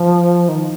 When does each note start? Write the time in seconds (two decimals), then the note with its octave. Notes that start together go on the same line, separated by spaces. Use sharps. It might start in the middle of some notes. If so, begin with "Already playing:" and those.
Already playing: F3
0.49 D#3